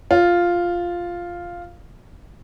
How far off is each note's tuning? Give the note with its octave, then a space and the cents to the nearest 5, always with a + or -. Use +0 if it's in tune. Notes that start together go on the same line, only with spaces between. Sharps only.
F4 +0